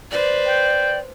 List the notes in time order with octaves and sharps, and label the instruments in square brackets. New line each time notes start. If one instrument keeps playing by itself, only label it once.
[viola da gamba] B4 C5 [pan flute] D5
[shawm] G5